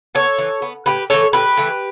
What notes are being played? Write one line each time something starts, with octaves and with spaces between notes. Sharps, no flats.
B3 A4 C#5
E3
B3
A2 G4 B4
E3 A3 A4 C#5
A2 G4 B4
E3 A3